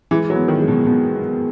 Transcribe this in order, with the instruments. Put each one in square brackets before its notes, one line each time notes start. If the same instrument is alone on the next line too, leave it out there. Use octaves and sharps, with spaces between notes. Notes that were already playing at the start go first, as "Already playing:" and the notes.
[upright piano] E3 [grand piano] G#3
[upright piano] F#3
[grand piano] B3
[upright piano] D#3
[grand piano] G#3
[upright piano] B2
[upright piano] B2 [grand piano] B3